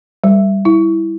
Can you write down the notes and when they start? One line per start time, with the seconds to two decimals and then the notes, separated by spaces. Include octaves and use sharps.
0.24 G3
0.65 E4